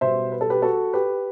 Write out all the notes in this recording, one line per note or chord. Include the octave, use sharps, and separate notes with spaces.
B1 B2 G3 B3 C5 E5
B4
A4
G4 B4
F#4 A4
G4 B4